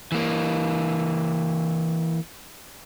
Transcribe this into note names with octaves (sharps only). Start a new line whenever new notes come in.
E3 A#3